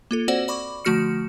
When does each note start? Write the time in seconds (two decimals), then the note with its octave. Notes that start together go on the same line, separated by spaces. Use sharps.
0.11 A#3 F4 A4
0.28 C4 F#4 C5 D5 F#5
0.48 D5 B5 C#6 D6
0.85 D3 F3 A3 F#4 F6 C#7